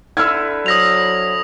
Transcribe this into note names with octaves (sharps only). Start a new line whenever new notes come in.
D3 E4 B4 E6 F6 G#6
F#3 C5 E5 D#6 A#6 F7